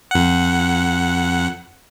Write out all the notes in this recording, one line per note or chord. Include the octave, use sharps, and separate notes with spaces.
F2 F#5